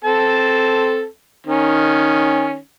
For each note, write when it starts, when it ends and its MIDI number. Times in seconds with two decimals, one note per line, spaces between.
0.04 1.05 60
0.04 1.05 69
0.04 1.05 81
1.47 2.57 51
1.47 2.57 61